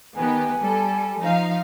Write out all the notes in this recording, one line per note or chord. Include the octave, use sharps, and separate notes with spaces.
D#3 B3 G4 G#5
G3 A4
F3 D#4 F5